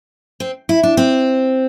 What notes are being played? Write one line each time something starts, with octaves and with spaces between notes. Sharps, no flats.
C4
E4
D4
C4